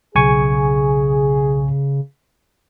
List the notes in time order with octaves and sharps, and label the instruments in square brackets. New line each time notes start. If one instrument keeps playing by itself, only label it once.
[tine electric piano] B1 G#5 C#6 [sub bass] C#3 [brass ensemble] G#4